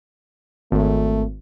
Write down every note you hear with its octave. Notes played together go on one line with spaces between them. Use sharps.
G#1 A3